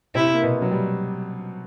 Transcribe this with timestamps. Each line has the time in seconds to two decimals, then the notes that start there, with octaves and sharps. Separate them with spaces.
0.15 C3 C4 E4
0.34 A#3
0.42 B2 B3
0.62 F#3
0.71 G3